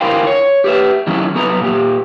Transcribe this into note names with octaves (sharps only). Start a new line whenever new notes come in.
D3 E4 A#4 C5 F5 G5
C#5
G4 B4 E5
D#3 F#3 C#4 E4
F#3 B3 A4 B4 A#5
A#2 G4